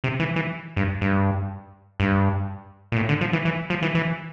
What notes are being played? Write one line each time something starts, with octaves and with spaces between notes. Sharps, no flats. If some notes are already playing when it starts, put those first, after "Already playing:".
C3
E3
E3
G2
G2
G2
A#2
A2
D3
F3
E3
E3
F3
E3
E3